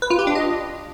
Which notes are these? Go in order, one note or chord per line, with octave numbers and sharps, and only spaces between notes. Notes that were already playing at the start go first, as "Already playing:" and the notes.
B4
F4
G4
D4
D#5